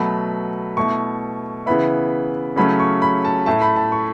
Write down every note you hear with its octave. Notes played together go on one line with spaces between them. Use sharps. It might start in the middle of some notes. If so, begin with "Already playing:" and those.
Already playing: B2 F#3 A3 B5
B2 A3 E4 C#6
C#3 E3 B3 E4 B5
C#3 F#3 A3 C#4 E4 B5
C#6
B5
A5
A2 A3 E4 A5
B5
A5
C#6